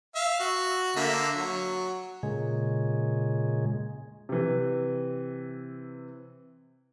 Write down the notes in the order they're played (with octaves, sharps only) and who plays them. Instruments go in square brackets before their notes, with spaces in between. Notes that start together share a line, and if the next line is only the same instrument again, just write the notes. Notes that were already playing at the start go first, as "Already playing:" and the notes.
[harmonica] E5 F5
F#4
D3 A#3 E5
F#3
[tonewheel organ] A#2 C#3 G#3
[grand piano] C3 E3